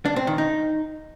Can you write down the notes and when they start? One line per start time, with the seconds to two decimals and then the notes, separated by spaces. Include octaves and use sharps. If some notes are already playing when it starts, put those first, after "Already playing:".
0.05 D4
0.16 C4
0.27 D#3
0.38 D#4